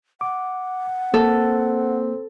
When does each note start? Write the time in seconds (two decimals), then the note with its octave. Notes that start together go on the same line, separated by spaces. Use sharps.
0.21 F#5 D6
1.14 A#3 C4 A4